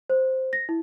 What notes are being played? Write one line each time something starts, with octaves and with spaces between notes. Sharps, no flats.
C5
A#6
E4